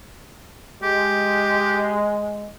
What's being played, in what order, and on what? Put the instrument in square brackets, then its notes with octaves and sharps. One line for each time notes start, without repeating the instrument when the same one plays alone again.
[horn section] G#3 [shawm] G4